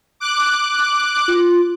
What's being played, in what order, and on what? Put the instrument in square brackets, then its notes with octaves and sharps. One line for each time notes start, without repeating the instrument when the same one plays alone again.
[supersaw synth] D6 F#6
[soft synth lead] F4